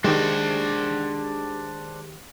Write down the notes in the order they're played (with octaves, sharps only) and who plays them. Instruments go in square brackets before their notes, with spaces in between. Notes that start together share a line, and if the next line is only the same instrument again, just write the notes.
[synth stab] D#3 G4 [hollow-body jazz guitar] G#3 [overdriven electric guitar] D4 C5